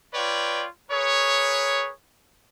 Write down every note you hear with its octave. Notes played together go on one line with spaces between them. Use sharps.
F4 B4 C#5 D5 G5
G#4 A#4 B4 C#5